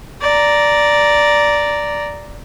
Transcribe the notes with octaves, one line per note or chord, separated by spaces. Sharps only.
D5 A#5